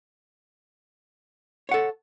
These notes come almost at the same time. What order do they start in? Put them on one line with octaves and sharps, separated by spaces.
C#5 F#5 A4